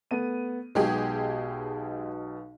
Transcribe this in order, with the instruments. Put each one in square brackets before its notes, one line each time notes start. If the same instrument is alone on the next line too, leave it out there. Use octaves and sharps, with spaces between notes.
[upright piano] A3 B3 D#7
[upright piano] B1 B2 [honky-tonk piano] G#3 G4 G#4